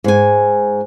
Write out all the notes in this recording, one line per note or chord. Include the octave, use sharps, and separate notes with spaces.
G#2 G#5